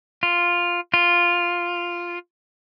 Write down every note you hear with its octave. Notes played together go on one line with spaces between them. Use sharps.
F4
F4